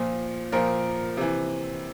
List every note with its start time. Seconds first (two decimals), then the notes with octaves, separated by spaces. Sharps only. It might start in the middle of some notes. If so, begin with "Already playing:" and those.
Already playing: A#2 F3
0.52 A#2 F3 A#3 A#4
1.17 C3 E3